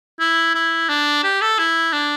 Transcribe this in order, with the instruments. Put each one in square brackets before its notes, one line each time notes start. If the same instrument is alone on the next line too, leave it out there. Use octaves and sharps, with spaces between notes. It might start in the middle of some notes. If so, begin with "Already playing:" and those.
[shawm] E4
E4
D4
G4
A4
E4
D4